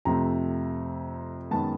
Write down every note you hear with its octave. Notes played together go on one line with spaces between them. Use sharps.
F2 C3 F3 A3 C4 A#5
F#2 D#3 G#3 B3 A5